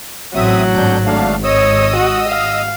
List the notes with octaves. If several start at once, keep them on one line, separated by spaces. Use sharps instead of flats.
A1 F#3 C4 E5 D#6
G#1 F2 D4 G6
A3 D4 F5
C#5 D#5 D#6 E6
F#4
F5